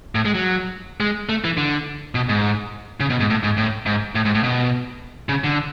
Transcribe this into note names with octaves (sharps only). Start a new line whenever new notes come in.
A2
G#3
F#3
G#3
A3
E3
D3
B2
G#2
C#3
B2
G#2
A2
G#2
A2
G#2
A2
G#2
A2
B2
C#3
D3